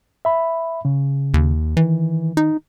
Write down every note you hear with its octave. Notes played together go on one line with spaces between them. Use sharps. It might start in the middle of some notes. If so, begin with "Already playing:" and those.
E5 B5
C#3
D#2
D#3 E3
D#4